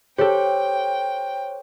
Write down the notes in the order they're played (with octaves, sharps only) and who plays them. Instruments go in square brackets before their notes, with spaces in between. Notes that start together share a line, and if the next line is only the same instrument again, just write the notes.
[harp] G4 A4 [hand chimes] C5 C#5 [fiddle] G5